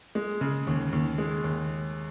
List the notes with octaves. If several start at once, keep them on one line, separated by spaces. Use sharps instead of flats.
G#3
C#3
D#2
D#2
G#3
D#2